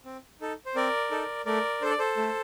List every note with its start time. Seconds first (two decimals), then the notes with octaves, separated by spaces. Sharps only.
0.05 C4
0.41 D#4 A4
0.66 C5
0.75 C4 A#4 D5
1.11 D#4 A4
1.46 A3 A#4 D5
1.81 D4 A4 C5
1.90 D5
1.99 A4 C5
2.17 A3